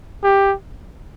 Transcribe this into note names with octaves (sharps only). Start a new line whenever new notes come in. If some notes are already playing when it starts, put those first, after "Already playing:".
G4